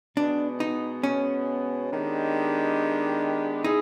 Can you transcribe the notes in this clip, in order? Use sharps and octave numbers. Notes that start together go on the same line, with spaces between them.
B2 G#3 B3 D4
D#4
C#4
D#3 G#3 B3 D4 G4
D#4 E4 G#4